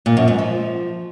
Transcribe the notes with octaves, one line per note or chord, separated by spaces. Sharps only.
A#2
F#2
G#2
F3